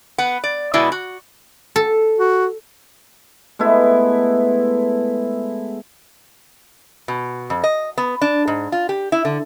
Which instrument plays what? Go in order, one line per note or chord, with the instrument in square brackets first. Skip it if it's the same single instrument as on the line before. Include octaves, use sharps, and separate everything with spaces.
[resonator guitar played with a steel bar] B3 F#5
D5
B2 G#3 B3 E4 D5
F#4
[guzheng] A4
[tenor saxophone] F#4
[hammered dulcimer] G#3 A3 B3 E4
[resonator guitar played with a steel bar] B2
F2
D#5
B3
D4
G#2
F4
G4
E4
D3